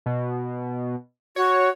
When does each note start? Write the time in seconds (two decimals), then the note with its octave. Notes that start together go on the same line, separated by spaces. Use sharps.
0.06 B2
1.36 F#4 C#5